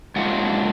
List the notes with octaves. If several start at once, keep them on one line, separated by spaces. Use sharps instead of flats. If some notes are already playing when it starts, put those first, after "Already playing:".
G#2 F#3 A#3 D4 F4 F#5